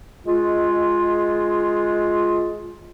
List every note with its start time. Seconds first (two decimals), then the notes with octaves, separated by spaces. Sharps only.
0.25 G#3 F4